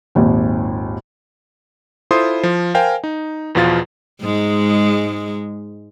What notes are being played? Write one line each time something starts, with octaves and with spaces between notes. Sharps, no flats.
G#1 D#2 A#2
E4 F4 A4 C5 C6 D#6
F3
A#4 C5 F5 G5 G#5
D#4
E2 B2 F3 F4 F5 A6
G#2 G#3